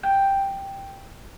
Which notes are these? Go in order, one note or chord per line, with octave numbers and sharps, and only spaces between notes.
G5